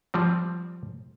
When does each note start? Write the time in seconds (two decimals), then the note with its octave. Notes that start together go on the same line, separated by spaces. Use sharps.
0.14 F3 G3 C4